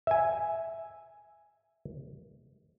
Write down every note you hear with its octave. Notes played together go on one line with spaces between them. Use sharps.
E5 G#5